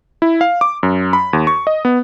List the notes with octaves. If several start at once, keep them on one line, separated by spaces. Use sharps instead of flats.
E4
F5
D6
F#2
B5
D#2
C#6
D#5
B3